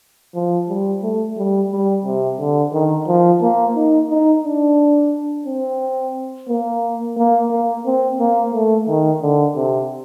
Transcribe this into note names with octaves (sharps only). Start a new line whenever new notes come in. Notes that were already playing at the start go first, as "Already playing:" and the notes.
F3
G3
A3
G3
G3
C3
D3
D#3
F3
A#3
D#4
D#4
D4
C4
A#3
A#3
A#3
C4
A#3
A3
D#3
D3
C3